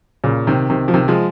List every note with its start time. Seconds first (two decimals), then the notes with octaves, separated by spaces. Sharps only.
0.24 A#2 C#3
0.47 C3 D#3
0.70 C3 D#3
0.88 F3
0.94 C3 D#3
1.08 F3 G#3